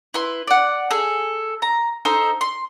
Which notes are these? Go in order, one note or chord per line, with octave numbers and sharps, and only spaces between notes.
E4 B4 C6
D5 F#5
G#4 A4
A#5
D#4 A4 C5
C6